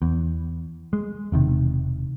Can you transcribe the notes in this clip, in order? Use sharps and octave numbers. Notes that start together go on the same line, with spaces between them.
E2
G#3
E1 C3 D#3